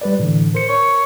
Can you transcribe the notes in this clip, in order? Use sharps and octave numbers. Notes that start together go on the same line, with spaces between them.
G3 B4 D5
A2 D3 E3
A#4 C5 C#7
C#5